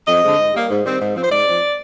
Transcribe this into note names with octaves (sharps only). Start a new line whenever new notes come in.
F2 D#5
D3 G#3 C4
G#2
G3 A#3
G#2
D#3 G3 C4
G#2
F3 C4
C5
G#2 D5
F3 C4